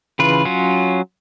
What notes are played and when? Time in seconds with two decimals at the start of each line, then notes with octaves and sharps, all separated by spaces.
0.19 C#3 E3 F4 B4
0.45 F#3 C#4 F4